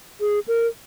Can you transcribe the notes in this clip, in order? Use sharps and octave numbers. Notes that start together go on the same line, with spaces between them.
G#4
A#4